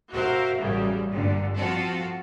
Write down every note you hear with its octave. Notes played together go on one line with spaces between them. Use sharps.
F#4 A#4 C5 E5 F5
A1 F#2 C#3 G3
G2 A#2 D3
F3 C4 F4 F#4 A4